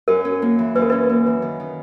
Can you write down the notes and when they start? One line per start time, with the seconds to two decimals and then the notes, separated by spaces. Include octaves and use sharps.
0.08 F#2 A#4
0.25 C#4
0.42 A#3
0.59 E3
0.75 F#2 B4
0.82 A#4
0.90 C#4 B4
1.09 A#3
1.26 E3
1.42 D#3
1.60 D#3